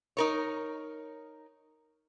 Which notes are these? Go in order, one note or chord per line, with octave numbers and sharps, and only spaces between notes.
D#4 A#4 C#5